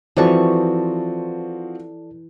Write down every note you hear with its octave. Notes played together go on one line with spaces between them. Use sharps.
E3 F3 C4 F#4 A4 D5 A5 C#6